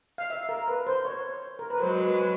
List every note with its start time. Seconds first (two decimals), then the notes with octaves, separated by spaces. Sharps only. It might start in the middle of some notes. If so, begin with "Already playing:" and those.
0.18 F5
0.30 E5
0.49 A#4
0.68 B4
0.87 C5
1.05 C#5
1.59 A#4
1.70 B4
1.80 F#3 G#3 C5
2.05 B4
2.19 B4